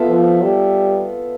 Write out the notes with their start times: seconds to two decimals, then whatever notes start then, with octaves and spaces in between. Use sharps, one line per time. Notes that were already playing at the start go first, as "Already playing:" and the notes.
Already playing: B3 F4 A4 E5
0.09 F3
0.43 G3